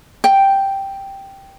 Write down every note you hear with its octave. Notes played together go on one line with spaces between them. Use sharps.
G5